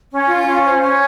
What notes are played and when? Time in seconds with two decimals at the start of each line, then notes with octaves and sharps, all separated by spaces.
0.11 C#4
0.28 F4
0.46 C#4
0.64 C5
0.81 C#4